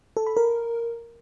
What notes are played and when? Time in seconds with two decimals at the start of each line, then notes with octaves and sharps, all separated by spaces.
0.17 A4
0.27 B5
0.37 A#4